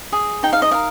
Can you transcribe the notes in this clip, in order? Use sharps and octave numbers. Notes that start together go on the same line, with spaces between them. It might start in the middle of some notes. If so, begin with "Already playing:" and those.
G#4
D#4 G5
F5
D#5
A#4 F5